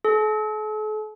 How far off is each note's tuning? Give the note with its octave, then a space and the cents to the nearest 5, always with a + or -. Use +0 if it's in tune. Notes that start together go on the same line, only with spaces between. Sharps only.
A4 -45